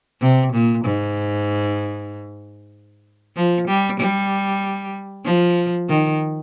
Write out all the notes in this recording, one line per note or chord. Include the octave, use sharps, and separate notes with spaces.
C3
A#2
G#2
F3
G3
G3
F3
D#3